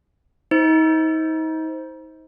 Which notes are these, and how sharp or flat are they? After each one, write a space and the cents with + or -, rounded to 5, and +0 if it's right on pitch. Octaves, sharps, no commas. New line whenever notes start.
D#4 +35 C5 +0